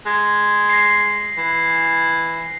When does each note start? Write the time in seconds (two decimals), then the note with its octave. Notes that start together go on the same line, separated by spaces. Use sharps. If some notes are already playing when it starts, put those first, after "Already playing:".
0.06 G#3
0.69 A#6 C7
1.38 E3